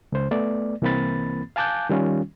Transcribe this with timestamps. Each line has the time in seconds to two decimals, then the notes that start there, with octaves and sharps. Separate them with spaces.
0.12 C#2 C5
0.31 A3 B3 D5
0.82 C2 E3 A#3 C4 B5 A6
1.56 F5 G#5 A5 D6 F#6 G6
1.89 D#3 G3 C#4 F4